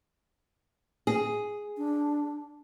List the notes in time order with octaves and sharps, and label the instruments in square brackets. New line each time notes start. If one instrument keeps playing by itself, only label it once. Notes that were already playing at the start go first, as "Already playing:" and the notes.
[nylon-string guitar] G#4
[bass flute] D4